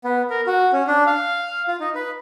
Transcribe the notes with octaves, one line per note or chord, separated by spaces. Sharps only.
B3
A#4
F#4
C#4
D4
F5
F4
D#4
B4